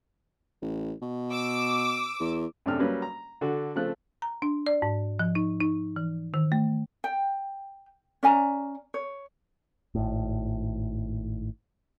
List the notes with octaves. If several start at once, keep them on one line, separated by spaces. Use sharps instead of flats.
A1
B2
D6 E6
E2
F#2 C3 A3 D4 G5 F6
F#3 G3 A#3 C#4 B4
A#5
D3 F#4 A4
C#3 F3 A3 C4 F#6
A#5
D4
D5
G#2
F3
D#4
D#4
E3
D#3
A3
G5
C#4 D5 G#5 A#5
C#5
G#1 A2